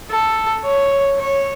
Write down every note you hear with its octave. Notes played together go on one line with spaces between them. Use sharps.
A4
C#5
C#5